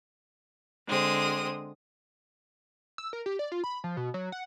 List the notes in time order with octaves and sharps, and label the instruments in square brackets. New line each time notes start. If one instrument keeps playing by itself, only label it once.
[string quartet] D3 G#3 C4 D#6
[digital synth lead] E6
A#4
G4
D5
F4
B5
F3
B2
F#3
F#5